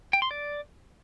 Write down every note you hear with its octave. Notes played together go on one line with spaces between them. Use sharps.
G5
C6
D5